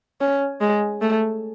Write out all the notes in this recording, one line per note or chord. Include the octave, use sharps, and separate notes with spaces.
C#4
G#3
A3